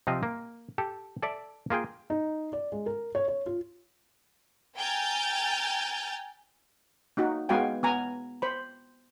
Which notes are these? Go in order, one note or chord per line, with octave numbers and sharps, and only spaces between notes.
C3 F3 C4 D#5 F5
A#3
G4 A4 A5
A4 D5 E5
A#3 F4 G#4 G5
D#4
D5
G#3
A#4
C#5
C#5
F4
G5 G#5 A#5 F6 G6 A6
A#3 D#4 F#4
G#3 B3 F#4 F5 G5 G#5
B3 G#5 A#5
C5 B5